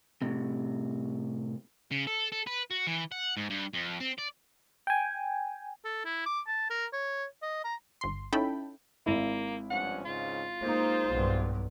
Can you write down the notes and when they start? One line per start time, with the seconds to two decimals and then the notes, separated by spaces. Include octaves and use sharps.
0.22 A2 C3
1.91 C#3
2.07 A4
2.32 A4
2.47 B4
2.70 F#4
2.87 E3
3.12 F#5
3.37 G#2
3.50 G2
3.73 F2
4.00 C4
4.18 D5
4.87 G5 G#5
5.85 A4
6.05 E4
6.26 D6
6.47 A5
6.70 A#4
6.93 C#5
7.42 D#5
7.64 A#5
8.01 G1 C6
8.33 C#4 D#4 E4 A4 G5 B5
9.06 G#1 A#3 E4
9.70 G2 F3 C#4 F#5
10.05 C#2 G#2 C#3 F4
10.62 G#3 A#3 D#4 C5
11.11 B1 G2